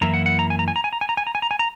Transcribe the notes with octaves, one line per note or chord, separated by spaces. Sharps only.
F#2 E3 A#3 E4 A#5
F#5
F#5
A#5
G#5
A#5
G#5
A#5
G#5
A#5
G#5
A#5
G#5
A#5
G#5
A#5
G#5
A#5